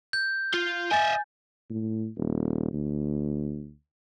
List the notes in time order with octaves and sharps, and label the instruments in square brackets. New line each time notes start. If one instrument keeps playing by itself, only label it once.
[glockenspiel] G6
[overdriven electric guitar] F4
[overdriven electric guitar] D#5 E5 [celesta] G#5 A6
[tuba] A2
D#1
D2